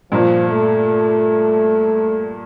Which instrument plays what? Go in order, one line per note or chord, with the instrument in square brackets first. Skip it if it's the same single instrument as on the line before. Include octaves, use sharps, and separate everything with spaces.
[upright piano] G2 A#2 [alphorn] F3
[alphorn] A3